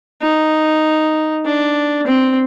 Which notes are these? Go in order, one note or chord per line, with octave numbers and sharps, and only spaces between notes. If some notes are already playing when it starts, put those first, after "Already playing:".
D#4
D4
C4